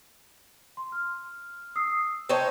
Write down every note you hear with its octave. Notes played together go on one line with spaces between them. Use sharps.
C6
F6
D#6 E6 C7
D#4 C5 C#5 G5 A5 G6